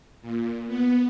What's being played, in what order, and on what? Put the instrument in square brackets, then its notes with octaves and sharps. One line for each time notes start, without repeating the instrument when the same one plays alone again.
[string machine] A#2
B3